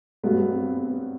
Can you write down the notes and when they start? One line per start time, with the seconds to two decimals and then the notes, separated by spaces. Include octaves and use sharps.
0.23 G2 F#3 A3 B3
0.51 C4
0.77 B3